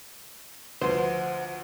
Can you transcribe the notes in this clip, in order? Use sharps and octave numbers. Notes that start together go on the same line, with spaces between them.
D2 F3 B4 C5 F#5